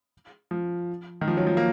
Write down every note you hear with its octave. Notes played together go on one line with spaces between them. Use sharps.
F3
D#3
F3
F#3
F3
A#3